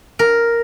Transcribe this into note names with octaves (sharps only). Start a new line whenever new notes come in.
A#4